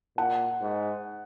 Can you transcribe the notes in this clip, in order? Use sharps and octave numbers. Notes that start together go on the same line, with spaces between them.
A#2 F#5
G#2